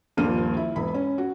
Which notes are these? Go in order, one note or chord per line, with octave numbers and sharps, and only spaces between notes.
D#1 G2 F3 A#3 F6 D#7
E4
E1 B5
C#4
F#4